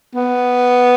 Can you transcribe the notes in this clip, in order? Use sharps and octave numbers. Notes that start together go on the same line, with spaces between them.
B3